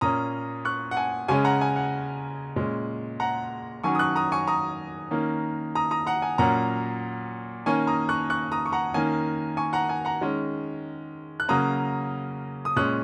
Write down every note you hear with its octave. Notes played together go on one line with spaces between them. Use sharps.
A#2 A#3 C#4 A#5 D#6
C#6 F#6
F#5
G#5
C#3 G#3 C#4 G#5 C#6
F#5 A#5
G#5
F#5
A#2 G#3 C#4
F#5 A#5
D#3 F#3 C#4 G#5 C#6
D#6
C#6 F#6
A#5 D#6
G#5 C#6
A#5 D#6
D#3 A#3 C#4
A#5 D#6
A#5 D#6
F#5 A#5
G#5
A#2 F#3 A#3 C#4 F#5 A#5
D#3 A#3 C#4 G#5 C#6
A#5 D#6
C#6 F#6
C#6 F#6
A#5 D#6
C#6
F#5 A#5
D#3 A#3 C#4 G#5
G#5 C#6
F#5 A#5
G#5
F#5 A#5
D#3 G#3 C#4
F#6
C#3 F#3 A#3 C#4 A#5 D#6
D#6
A#2 G#3 C#4 C#6 F#6